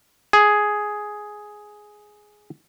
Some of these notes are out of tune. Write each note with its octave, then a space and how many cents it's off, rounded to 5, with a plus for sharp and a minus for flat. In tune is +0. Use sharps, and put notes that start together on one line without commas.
G#4 +5